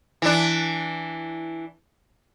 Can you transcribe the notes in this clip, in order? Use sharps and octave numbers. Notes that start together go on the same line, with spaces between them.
E3 D4